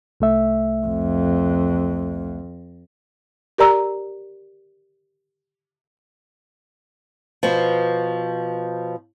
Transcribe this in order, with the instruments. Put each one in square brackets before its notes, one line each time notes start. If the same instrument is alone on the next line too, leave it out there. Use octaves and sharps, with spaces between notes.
[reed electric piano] C2 A3 E5
[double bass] F2
[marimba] G4 A#4 D5 A#5 E6
[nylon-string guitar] B2 F3